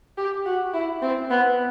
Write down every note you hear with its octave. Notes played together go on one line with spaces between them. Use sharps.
G4
F#4
E4
C4
B3